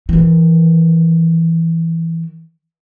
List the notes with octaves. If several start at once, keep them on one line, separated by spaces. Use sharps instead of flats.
D#3 E3